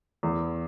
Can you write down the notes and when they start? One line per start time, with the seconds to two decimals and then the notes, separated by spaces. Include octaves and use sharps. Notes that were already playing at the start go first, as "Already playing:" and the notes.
0.23 E2